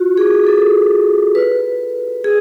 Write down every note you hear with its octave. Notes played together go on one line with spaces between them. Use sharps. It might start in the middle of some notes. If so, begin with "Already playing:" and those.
Already playing: F4 F#4
G#4
A4
B4
G#4